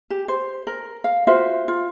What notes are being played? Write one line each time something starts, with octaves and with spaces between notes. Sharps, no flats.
G4
C5
A#4
F5
F4 F#4 C5 E5
F4